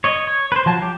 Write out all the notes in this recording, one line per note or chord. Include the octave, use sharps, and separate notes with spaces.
C#5 D#5
C#5
B4 C5
F3 F#3 A5
G4